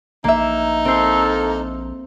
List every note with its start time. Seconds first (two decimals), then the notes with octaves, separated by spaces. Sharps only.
0.24 A#1 A#3 D#4 E5
0.85 A#3 C4 A4 C5